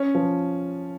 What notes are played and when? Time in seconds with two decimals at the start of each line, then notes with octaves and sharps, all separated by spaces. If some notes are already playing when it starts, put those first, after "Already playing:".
Already playing: C#4
0.15 F3